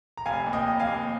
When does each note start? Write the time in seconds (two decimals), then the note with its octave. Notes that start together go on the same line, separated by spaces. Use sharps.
0.17 A#5
0.26 F1 F5 G#5
0.46 D#2
0.53 D#5 G5
0.66 F1
0.79 F5 G#5
0.87 D#2